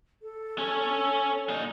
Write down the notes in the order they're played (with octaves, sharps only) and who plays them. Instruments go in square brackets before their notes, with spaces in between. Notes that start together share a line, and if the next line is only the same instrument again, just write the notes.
[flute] A4
[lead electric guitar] C#4 C#5
A#2 D#4